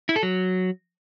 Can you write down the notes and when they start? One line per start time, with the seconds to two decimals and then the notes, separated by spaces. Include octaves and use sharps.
0.09 E4
0.16 A4
0.23 F#3